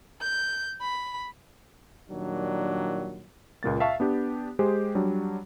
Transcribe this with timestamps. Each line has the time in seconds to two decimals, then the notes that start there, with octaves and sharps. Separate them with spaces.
0.21 G6
0.81 B5
2.09 A#2 D#3 F#3 G3 D4
3.63 C#2 A#2 A#3 A6
3.80 E5 F5 A5 C#6
4.00 B3 D4 G4
4.59 G#3 G4 G#4 C5
4.95 F#3 G3 D4